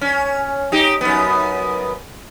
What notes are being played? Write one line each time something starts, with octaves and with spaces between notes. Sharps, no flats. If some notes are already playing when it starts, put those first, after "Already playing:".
C#4
D#4 G4
F#2 B3